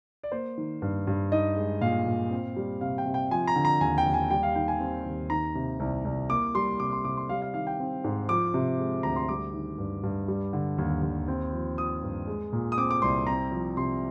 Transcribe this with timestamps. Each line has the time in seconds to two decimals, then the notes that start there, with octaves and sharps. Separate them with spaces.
0.23 D5
0.32 A#3 C5
0.58 D#3
0.82 G2
1.07 G2
1.32 D#4 D#5
1.56 G#3
1.81 A#2 F5
2.06 A#2
2.31 C4
2.56 G3
2.81 C3 F5
2.98 G5
3.06 C3
3.14 G5
3.31 F3 G#5
3.48 A#5
3.56 D3
3.65 A#5
3.81 D#2 G#5
3.98 G5
4.06 D#2
4.14 G#5
4.30 G3 G5
4.43 F5
4.56 D#3 G5
4.68 G#5
4.80 C4
5.05 D#2
5.30 D#3 A#5
5.55 C3
5.80 C2
6.05 C2
6.30 A#3 D6
6.55 G3 C6
6.80 C3 D6
6.92 C6
7.04 C3 D6
7.17 C6
7.29 G3 F5
7.42 F5
7.54 D#3 F5
7.67 G5
7.80 C4
8.04 G#2
8.29 F3 D6
8.54 C3
8.79 G#3
9.03 D2 A#5
9.16 C6
9.28 G3 D6
9.54 D#3
9.78 G2
10.03 G2
10.28 G3
10.53 D3
10.78 D#2
11.03 D#2
11.28 C4
11.53 F3
11.78 F4 D#6
12.03 G2
12.27 G#3
12.52 A#2
12.72 D#6
12.77 C4 D6
12.91 D6
13.02 C2 C6
13.27 C4 A#5
13.52 F3
13.76 C3 C6